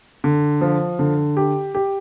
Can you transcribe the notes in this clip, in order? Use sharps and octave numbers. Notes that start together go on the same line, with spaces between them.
D3
F3
D3
G4
G4